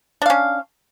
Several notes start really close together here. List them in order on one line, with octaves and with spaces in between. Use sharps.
D4 F5 C#4